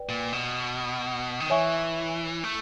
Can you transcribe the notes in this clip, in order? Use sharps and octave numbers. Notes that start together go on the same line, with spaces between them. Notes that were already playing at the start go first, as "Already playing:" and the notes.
Already playing: B4 D5 G5
A#2
B2
D#3
E3 C#5 E5 G#5 C#6
A3